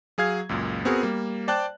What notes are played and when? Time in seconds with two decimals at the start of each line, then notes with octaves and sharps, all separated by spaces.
0.18 F#3 G#4 F5 G#6
0.49 C#2 F#2 A#2
0.85 B3 C4 F#4 G#4 A#4
1.03 G3 A#3
1.48 C5 D5 G5 A5 F#6